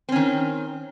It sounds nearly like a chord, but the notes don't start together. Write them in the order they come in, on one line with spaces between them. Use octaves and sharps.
C4 C#4 D#3